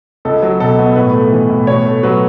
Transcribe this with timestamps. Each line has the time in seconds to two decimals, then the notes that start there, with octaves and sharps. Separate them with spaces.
0.25 C#2 A4
0.42 F#3
0.60 B2 A4
0.78 B3
0.96 A2 B4
1.14 A3
1.32 E3
1.50 A2
1.67 B2 C#5
1.86 A3
2.03 F#3 B4